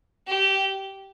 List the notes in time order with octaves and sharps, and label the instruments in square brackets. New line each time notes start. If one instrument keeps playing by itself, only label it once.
[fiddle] G4